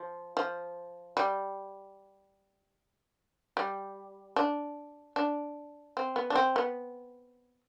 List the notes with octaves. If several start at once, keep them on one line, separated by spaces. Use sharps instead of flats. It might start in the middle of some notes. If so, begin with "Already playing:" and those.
Already playing: F3
F3
G3
G3
D4
D4
C4
B3
D4
C4
B3